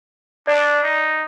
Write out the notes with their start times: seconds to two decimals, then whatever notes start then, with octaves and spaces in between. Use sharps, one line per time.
0.47 D4 D5
0.83 D#4